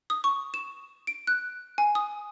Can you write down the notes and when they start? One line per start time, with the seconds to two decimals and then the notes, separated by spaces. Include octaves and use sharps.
0.10 D#6
0.24 C#6
0.54 E7
1.07 D7
1.27 F#6
1.78 G#5
1.95 D#6